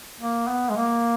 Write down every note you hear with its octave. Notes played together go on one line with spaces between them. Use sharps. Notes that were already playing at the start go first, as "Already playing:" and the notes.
A#3
B3
G#3
A#3